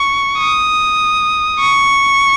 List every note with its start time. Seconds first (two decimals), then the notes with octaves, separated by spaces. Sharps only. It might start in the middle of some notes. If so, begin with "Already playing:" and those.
Already playing: C#6
0.39 D#6
1.59 C#6